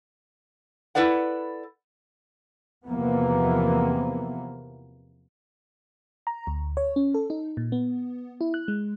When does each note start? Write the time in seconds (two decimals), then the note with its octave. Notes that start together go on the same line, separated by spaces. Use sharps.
0.95 E4 A4 B4 D5 F#5
2.87 E2 C3 E3 F3 A#3 B3
6.27 A#5
6.47 D2
6.77 C#5
6.96 C#4
7.14 A4
7.30 D#4
7.57 A#2
7.72 B3
8.41 E4
8.54 F#6
8.68 G#3